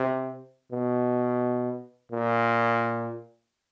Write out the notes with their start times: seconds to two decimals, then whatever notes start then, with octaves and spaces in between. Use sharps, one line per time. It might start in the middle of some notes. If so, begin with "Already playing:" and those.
Already playing: C3
0.72 B2
2.12 A#2